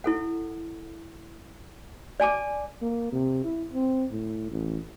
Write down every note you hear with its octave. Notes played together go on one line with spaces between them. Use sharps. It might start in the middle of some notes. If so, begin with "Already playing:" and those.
E4 A4 F#5
D5 G#5 A5 D6
A#3
C3
E4
C4
A2
A1